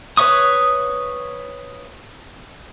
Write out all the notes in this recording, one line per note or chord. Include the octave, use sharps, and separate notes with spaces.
B4 C#5 E5 C#6 D#6